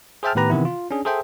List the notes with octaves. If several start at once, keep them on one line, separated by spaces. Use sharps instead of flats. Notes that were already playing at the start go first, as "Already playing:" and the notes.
G#4 C5 E5 G5 A5 F6
A2 D#3 B3 G4 B4 A#5
C3 D#3 E3 B3 E4
F4
C#4 D4 G#4
G#4 A4 C5 E5 G5